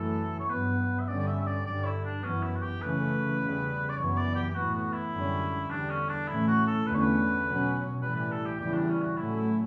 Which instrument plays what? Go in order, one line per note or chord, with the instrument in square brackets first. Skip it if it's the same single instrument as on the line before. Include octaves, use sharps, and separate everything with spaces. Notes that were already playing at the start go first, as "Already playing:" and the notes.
Already playing: [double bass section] F#2 E3 A3 [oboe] A4
[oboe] C#5
[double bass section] G2 F#3 B3 [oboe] B4
[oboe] E5
[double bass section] G2 D3 G3 C#4 [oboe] D5
[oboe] D5
E5
E5
D5
[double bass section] G2 D3 G3 [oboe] D5
[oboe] E4
D4
[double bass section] F#2 E3 B3 [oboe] C#4
[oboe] E4
F#4
G4
[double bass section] C#3 E3 A3 C#4 [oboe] B4
[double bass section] E2 C#3 G3
[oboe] D5
[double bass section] F#2 E3 B3 [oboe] C#5
[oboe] D5
G4
G4
[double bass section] A2 E3 B3 [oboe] F#4
[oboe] F#4
E4
[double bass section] F#2 D3 G3 C#4
[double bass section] E2 D3 G3 [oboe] D4
[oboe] C#4
D4
[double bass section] A2 E3 A3 C#4 [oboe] E4
[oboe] F#4
A4
[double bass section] E2 D3 A3 C#4 [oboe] B4
[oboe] C#5
B4
[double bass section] B2 F#3 C#4
[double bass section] A2 E3 G3 [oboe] B4
[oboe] B4
A4
G4
[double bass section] E2 C#3 E3 G3 [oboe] G4
[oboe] D4
C#4
F#4
[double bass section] A2 F#3 A3 C#4 [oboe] E4
[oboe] E4